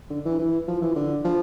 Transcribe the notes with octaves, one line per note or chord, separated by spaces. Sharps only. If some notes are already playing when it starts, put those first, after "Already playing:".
D3
E3
E3
F3
E3
D3
F3